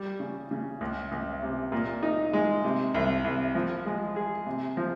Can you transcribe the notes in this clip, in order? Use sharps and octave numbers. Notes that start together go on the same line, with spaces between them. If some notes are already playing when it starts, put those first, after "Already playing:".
Already playing: G3
C#3
C#3
C#2
C#2
C3
A#2
D#4
G#3
C3
C2
C2
F3
G#3
G#4
C3
F3